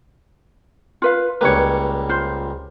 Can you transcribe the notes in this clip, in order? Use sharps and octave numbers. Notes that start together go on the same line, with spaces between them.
F4 B4 F5
C#2 G3 A#3 B4 C#5
F4 C5